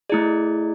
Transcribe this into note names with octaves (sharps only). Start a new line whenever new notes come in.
A3 E4 G#4 D5